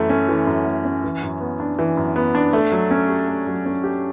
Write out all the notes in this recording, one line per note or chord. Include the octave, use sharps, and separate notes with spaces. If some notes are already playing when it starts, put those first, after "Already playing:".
Already playing: F#2 E3 A3
C#4
E3
F#2
A3
C#4
E3
F#2
B3
D4
E3
F#2
B3
D4
A3
F#3
C#4
G4
A3
F#3
C#4
G4